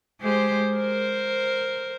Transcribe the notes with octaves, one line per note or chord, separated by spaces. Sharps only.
G#3 G4 C5
A#4 C5